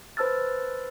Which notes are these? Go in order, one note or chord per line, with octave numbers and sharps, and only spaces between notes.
B4 C5 A5 E6 F6 A6